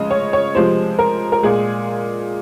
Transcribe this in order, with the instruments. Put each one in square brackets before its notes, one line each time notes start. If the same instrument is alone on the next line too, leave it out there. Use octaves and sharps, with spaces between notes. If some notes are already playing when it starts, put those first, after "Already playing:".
Already playing: [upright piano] C#3 F3 G#3 D#5
C#5
C#5
C3 F3 G#3 C5
A#4
A#4
A#2 G#3 G#4